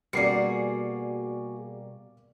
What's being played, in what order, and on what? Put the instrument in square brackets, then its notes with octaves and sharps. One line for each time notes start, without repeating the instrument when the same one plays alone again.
[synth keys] B2 G3 A#3 [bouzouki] F#4 G#4 [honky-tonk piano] D5 C7 C#7